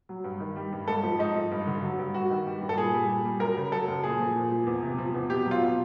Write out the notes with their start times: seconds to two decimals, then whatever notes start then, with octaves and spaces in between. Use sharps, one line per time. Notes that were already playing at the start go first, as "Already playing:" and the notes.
0.09 F#3
0.24 G2
0.40 D#3
0.56 G3
0.72 G2
0.88 G#2 A4
1.03 F3
1.19 G#2 D#4
1.35 F3
1.51 G2
1.67 D3
1.82 F#3
1.99 G2
2.14 G2 F#4
2.31 D#3
2.46 G3
2.62 G2
2.69 A4
2.77 A#2 G#4
2.94 G3
3.09 A#2
3.25 G3
3.40 F#2 A#4
3.57 C#3
3.72 F#3 A4
3.88 F#2
4.04 A#2 G#4
4.19 F3
4.36 A#2
4.51 F3
4.67 E2
4.83 C3
4.98 F3
5.14 E2
5.30 B2 G4
5.46 F#3
5.51 F4
5.62 B2